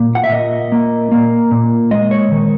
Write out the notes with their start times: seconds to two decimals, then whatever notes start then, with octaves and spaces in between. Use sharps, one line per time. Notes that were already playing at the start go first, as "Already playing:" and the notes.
Already playing: A#2 A#3
0.15 F#5
0.24 E5
0.32 A#2 D#5
0.72 A#3
1.12 A#3
1.51 A#2
1.91 G#3 D#5
2.11 C#5
2.31 D#3